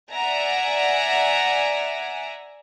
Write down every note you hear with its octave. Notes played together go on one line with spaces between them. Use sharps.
D5 E5 F#5 G#5 A#5